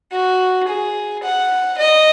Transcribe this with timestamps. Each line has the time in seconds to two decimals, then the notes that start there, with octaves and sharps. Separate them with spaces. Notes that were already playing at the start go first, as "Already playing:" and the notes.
0.12 F#4
0.68 G#4
1.24 F#5
1.78 D#5